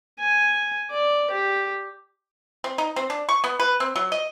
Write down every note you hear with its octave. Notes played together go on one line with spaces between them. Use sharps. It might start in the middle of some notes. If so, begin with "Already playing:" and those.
G#5
D5
G4
C4
D#4
C4
D4
C#6
B3
B4
C4
F#3
D#5